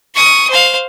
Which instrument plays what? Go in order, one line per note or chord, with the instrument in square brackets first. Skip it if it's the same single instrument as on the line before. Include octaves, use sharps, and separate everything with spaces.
[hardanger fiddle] C#6 D#6
C5 F5